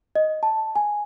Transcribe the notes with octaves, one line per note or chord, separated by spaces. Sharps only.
D#5
A5
G#5